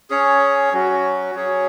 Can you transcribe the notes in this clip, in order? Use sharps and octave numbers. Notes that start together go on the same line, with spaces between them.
C#4 G#4 C#5
F#3 C#4 F#4
F#3 C#4 G#4 C#5